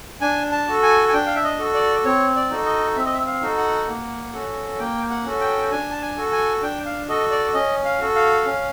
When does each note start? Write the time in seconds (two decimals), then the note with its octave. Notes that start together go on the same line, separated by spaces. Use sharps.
0.21 D4 G#5
0.52 A5
0.68 F#4 A4
0.83 G#5
1.08 G#5
1.13 D4 G5
1.26 F5
1.36 E5
1.44 D#5
1.59 F#4 A4
1.74 D5
2.05 C4 C#5
2.36 D5
2.50 D#4 F#4 A4
2.66 D#5
2.96 C4 E5
3.05 D#5
3.13 E5
3.26 F5
3.42 D#4 F#4 A4
3.58 F#5
3.88 A#3
4.33 C#4 F#4 A4
4.79 A#3 G5
5.10 F#5
5.25 C#4 F#4 A4
5.41 G5
5.71 D4 G#5
5.91 A5
6.01 G#5
6.17 F#4 A4
6.32 G#5
6.62 D4 G5
6.85 F5
7.08 F#4 A4 D#5
7.31 D5
7.54 C#4 D#5
7.85 F5
7.99 F#4 A4
8.15 F5
8.46 C#4